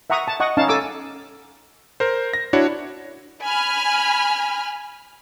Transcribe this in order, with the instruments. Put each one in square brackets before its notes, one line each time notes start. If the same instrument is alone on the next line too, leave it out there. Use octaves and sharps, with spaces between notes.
[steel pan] E5 F#5 A#5 C#6 D#6
A5
D#5 F#5 C#6 D#6
C#4 D#4 F5 A5
A4 G#5 D6 E6
[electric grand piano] A#4 C5
A#6
D4 E4 F#4 C#5
[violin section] G#5 B5 F6